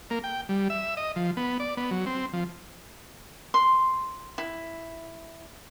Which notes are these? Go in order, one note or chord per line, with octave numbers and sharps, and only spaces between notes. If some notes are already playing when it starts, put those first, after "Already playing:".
A#3
G5
G3
E5
D#5
F3
B3
D5
B3
F#3
C4
F3
C6
E4